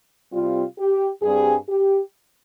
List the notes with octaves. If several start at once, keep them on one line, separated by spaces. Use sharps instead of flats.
C3 G3 C4 F4
G4
G2 G3 C4 G#4
G4